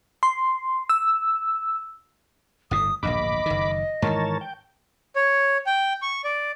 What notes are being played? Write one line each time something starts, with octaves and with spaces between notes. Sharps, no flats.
C6
E6
G1 A2 D#6
D1 A#1 G2 D#5 B5 D6
F#1 D#3
G#2 D#3 E3 A#4 C#5 A5
G5
C#5
G5
C#6
D5